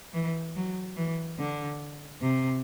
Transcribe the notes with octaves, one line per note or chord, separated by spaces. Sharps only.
E3
F#3
E3
D3
C3